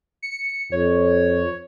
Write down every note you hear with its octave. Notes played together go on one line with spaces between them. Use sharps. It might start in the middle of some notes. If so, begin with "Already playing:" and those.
C#7
F2 C#5